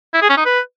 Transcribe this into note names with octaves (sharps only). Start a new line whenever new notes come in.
E4
G#4
C#4
D#4
B4